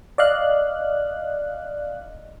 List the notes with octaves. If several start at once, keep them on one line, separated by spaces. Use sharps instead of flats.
D5 D#5 F5 F#6